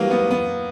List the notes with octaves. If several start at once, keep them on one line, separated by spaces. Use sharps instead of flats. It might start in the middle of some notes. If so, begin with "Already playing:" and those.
Already playing: G#2 E3 F#3 G3 A#3
B3
B3